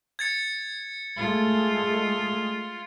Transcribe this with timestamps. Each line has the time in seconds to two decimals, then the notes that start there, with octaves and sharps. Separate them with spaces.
0.19 G#6 A6 C#7
1.17 G#3 A3 F4